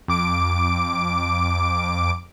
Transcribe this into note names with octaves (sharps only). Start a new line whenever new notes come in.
F2 D6 D7